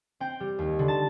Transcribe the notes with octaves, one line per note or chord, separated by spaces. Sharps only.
C4 G5
G3
D#2
D3
A5